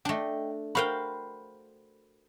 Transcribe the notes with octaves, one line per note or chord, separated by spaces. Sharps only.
A3 D4 D#5 G5
F#4 A#4 C5 F5 G5 B5